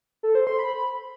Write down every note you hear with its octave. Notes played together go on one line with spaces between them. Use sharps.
A4
C5
C6
B5